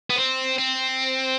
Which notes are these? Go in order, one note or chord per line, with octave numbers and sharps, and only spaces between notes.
B3
C4
C4